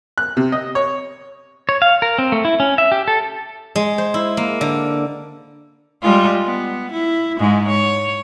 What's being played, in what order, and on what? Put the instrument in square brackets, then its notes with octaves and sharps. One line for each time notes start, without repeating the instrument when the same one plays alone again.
[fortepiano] F#6
C3
D#5
C#5
[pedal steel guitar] C#5
F5
A#4
C4
A3
E4
C#4
E5
G4
A4
[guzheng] G#3
C5
E4
A#3
D3
[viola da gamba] G3 G#3 F4
B3
E4
G#2 G#3
C#5